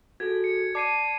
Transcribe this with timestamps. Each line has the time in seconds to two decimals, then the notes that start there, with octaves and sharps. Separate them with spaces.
0.20 F#4 G#4 A4 G#6
0.44 C#7
0.75 D5 A5 D6 C7 D#7